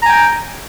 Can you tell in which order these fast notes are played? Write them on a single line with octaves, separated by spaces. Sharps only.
A#5 G#5 G5